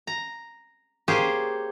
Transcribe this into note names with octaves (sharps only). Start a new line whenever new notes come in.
A#5
A#3 G4 G#4 C5 C#5